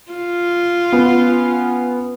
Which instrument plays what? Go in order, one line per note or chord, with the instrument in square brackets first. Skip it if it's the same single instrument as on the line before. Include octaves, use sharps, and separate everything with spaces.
[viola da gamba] F4
[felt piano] B3 [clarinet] C#4